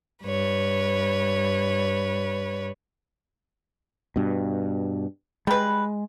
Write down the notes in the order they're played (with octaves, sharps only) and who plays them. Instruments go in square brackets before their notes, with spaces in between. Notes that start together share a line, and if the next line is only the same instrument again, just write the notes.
[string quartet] G2 B4 C#5
[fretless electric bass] G2 B2
[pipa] G3 B4 [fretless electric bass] G#3